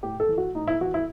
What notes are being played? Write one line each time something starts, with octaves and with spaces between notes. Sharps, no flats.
A2 G4
A4
E3
F#4
A2 D#4
E4
E3 F#4
E4